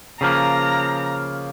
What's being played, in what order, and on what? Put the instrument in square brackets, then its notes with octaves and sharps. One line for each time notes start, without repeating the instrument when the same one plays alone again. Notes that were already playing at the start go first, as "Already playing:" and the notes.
[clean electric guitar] C#3 F3 A#3 [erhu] A#5